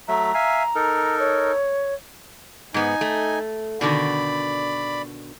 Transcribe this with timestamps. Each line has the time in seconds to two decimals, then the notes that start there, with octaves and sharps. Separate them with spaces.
0.08 F#3 A3 E5 A#5
0.34 E5 F5 G#5
0.75 D#4 A4 A#4
1.19 C#5
2.74 G#2 B3 D#4 G#5
3.01 A3
3.81 B2 D3 D#3 D5 B5